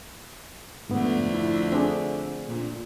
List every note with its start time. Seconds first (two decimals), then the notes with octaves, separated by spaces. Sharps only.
0.89 F2 G#2 D3 A3 B3
1.34 E4
1.72 C4 D4 G#4
2.47 A#2